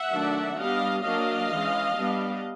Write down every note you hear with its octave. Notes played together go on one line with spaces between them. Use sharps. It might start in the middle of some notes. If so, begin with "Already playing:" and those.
Already playing: E5 F#5
D#3 F#3 A3 D4
G3 B3 D4 D#5 F5
F#3 A#3 D4 D#5 F5
E3 G#3 C#4
G3 B3 D4